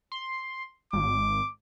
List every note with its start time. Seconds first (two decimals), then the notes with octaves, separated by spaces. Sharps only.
0.12 C6
0.93 G#1 D6